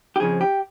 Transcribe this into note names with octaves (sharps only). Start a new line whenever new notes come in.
G4
F2 C#3 F3 G#4
G4